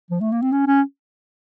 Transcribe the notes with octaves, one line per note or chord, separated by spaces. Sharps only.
F3
A3
A#3
C4
C#4
C#4